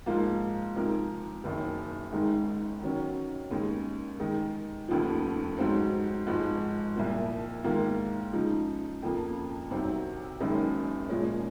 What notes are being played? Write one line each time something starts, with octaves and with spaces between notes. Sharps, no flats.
G#2 F3 A#3 F4
C3 F3 G#3 D#4 A#4
F#1 F#2 D#3
G#1 G#2 D#3 G#3 D#4
D#3 F#3 C#4
D#2 C#3 G#3
D#3 G#3 D#4
F1 D#2 C#3 F3
G#2 F#3 C4 D#4
G#1 G#2 F3 G#3
C2 A#2 F3
G#2 D#3 A#3 F4
C#3 F3 G#3 D#4
F2 C#3 F3 A#3
C2 C3 F#3 C4 D#4
F#1 F#2 D#3 G#3 D#4
A#2 F3 G#3 C#4